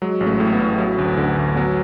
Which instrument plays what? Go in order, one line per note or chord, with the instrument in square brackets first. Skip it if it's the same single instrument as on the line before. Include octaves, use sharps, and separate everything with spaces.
[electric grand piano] F#3 G#3
A1
A3
A2
B3
A1
F#3
D2
D3
D2
F#3 B3